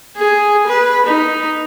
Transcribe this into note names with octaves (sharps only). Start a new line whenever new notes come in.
G#4
B4
D#4